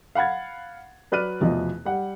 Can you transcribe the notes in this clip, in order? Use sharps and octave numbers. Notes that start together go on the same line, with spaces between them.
F5 F#5 B5 G#6 A6
F#3 B4 D5 F6 F#6 D#7
F1 E2 B2 F3 D#5
G3 F#5